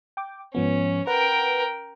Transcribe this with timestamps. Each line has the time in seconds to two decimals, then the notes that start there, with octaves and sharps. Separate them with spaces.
0.17 G5 D6
0.55 G#2 F3 B3 C#4
1.07 A#4 B4 F#5 G5